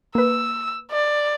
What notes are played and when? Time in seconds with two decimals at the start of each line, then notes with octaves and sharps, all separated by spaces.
0.15 A#3 B4 E6
0.91 D5